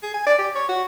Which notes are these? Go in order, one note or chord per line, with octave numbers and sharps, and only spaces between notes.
G#4
G#5
D5
G4
C#5
F#4